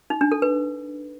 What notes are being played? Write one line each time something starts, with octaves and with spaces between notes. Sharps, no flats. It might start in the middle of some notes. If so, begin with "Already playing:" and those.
D#4
D4
A4
B4